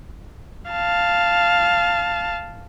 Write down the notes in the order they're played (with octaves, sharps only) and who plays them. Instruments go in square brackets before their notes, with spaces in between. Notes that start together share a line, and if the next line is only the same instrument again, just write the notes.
[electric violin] F5 A5